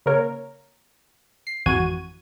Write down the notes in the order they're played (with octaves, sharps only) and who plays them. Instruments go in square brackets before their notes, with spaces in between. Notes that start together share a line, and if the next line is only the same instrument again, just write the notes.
[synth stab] C#3 A#3 A#4 C#5
C7
G#1 F2 E3 F#4 G#6 D#7